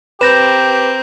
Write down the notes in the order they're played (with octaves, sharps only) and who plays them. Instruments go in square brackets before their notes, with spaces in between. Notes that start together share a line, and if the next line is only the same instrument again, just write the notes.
[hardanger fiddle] C4 A#4 [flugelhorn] G4 [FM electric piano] B4 [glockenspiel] G6 A#6 E7